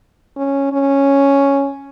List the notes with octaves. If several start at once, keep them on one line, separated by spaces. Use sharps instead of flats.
C#4
C#4